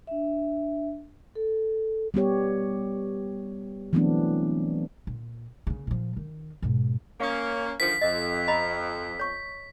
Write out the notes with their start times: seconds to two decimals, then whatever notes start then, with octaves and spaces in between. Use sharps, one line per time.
0.07 D4 E5
1.35 A4
2.14 G3 B3 G4 C#5
3.93 E3 F#3 A3 B3 C4 D4
5.07 A#2
5.67 C#3 A#3
5.87 A#2 F3
6.16 D#3
6.62 G#2 B2
7.21 A#3 C#4 F5 C#6 D#6
7.80 D3 D#3 F3 B6
8.01 F2 D#5
8.48 D#5 A#5 B5
9.20 C#5 C#6